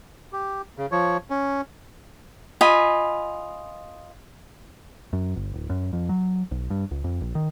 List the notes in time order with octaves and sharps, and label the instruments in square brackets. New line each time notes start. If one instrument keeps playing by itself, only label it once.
[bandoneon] G4
C#3
F3 C#5
C#4
[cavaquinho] F4 D#5 G#5 B5
[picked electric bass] F#2
G1
D1
F#2
F2
F#3
B1
G2
C#2
F2
A#1
D#3